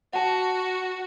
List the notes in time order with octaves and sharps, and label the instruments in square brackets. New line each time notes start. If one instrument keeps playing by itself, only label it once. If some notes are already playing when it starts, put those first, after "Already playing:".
[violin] F#4 [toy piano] F#5 A5